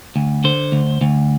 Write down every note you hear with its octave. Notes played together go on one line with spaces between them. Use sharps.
D2
D3 C5
D2
D2